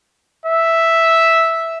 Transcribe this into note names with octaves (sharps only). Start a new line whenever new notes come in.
E5